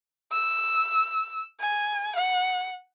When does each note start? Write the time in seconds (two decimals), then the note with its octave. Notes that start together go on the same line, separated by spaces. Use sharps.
0.33 E6
1.60 G#5
2.16 F#5